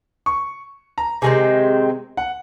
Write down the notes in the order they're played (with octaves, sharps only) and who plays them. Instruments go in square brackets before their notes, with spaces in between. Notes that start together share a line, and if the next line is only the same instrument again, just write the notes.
[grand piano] C#6
A#5
[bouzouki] C3 D#3 G#3 C4 [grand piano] G#5
[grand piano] F#5